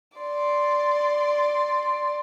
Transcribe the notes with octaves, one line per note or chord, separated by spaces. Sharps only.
D5 C6